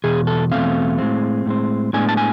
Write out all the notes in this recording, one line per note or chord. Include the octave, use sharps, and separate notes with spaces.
E2 B2 G#4
A4
E2 B2 A3 C4 F5
A2 G#3 C4
A2 G#3 C4
A2 G#3 B3 D4 G#5
A5
G#5